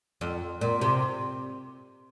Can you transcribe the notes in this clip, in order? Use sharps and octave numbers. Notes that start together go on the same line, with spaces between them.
F2
A#2
C3